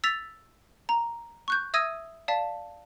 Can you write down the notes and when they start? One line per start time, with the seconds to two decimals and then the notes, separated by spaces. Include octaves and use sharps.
0.04 E6 A6 B6 F7
0.89 A#5
1.48 C#6 F#6 G6
1.74 E5 D#6 E6 G#6 A#6 D#7
2.28 D5 F5 A5 B6